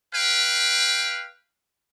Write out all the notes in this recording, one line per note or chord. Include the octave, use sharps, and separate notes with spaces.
B4 F5 G5